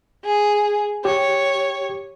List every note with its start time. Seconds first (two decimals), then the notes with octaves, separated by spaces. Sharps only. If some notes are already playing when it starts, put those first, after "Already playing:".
0.24 G#4
1.05 G4 C#5